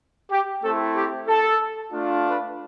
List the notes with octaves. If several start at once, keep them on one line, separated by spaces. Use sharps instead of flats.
G4
A3 C4 E4 A4
G4
A4
A3 D4 F4
B4